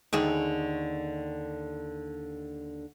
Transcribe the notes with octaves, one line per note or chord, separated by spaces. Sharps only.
D#2 D3 G#4